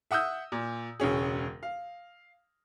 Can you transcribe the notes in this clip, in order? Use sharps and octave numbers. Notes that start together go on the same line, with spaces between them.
E5 F#5 D#6 E6 G6
A#2
E1 C#2 C#4 G#4
F5